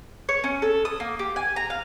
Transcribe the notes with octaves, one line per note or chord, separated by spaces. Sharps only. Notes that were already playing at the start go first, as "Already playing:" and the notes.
C#5
C#4
A4
D#6
A#3
G4
G#5
A#5
F5